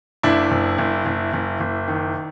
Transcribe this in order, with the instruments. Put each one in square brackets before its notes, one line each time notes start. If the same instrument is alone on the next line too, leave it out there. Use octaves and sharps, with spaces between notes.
[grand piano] F#1 D4 E4
F#1
F#1
F#1
F#1
F#1
D#3